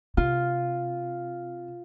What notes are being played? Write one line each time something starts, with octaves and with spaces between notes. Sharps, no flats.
C3 F4